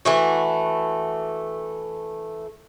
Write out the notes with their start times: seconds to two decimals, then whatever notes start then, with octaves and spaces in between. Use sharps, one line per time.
0.05 E3 A3 F#4